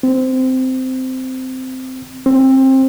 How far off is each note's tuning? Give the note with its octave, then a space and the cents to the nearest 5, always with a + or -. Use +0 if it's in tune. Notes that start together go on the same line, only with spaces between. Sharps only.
C4 -15
C4 +20